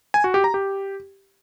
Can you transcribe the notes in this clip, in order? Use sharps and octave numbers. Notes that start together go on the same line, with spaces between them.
G#5
F#4
G4
A#5
G4